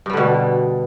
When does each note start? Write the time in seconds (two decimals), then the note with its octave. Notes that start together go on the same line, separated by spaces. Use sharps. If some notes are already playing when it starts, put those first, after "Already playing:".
0.06 G2
0.10 G3
0.13 D3
0.17 B2